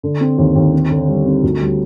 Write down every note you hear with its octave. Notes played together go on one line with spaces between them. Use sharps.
D3
C4
D#2
D#2
C4
D3
G3
C4
D2
G3